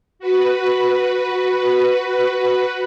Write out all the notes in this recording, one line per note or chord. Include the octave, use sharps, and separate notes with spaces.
F#4 B4